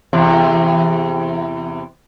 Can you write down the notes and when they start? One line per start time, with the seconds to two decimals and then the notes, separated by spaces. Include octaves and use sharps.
0.13 E2 C3